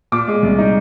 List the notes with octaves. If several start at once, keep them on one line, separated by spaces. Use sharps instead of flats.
A#2 D6
G#3
C2
D#4